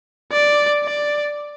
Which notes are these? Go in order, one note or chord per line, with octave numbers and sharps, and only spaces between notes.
D5
D5